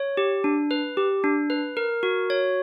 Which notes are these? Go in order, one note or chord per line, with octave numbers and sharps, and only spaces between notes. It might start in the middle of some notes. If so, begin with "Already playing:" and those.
Already playing: C#5
G4
D4
B4
G4
D4
B4
A#4
F#4
C#5